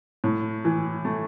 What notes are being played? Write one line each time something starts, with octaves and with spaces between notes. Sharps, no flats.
A2
E3
A3